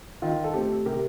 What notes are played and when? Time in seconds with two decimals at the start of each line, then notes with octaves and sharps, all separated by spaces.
0.22 D#3 F4
0.44 A4
0.54 A3 C4 G4
0.86 C3 G4 A#4